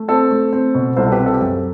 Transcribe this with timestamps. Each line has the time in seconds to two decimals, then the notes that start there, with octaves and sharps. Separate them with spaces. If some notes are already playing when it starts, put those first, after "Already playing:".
Already playing: A3
0.08 C4 A4
0.31 A3
0.53 C4
0.75 B2
0.96 C2 A4 C5
1.06 A4
1.12 G4 B4
1.19 C4
1.26 A4
1.33 G4
1.41 F#2 A4